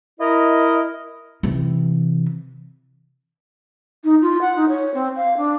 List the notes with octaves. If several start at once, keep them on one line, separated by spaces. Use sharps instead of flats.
E4 A#4 D#5
C3 E3
D#4
F4
F#5
D#4
C#5
C4
F5
D4